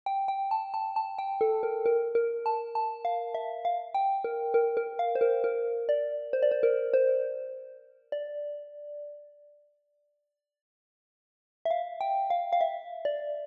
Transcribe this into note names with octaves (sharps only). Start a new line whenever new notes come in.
G5
G5
A5
A5
A5
G5
A4
A#4
A#4
A#4
A5
A5
F5
E5
F5
G5
A#4
A#4
A#4
F5
C5
A#4
A#4
D5
C5
D5
C5
A#4
C5
D5
E5
F5
G5
F5
F5
E5
D5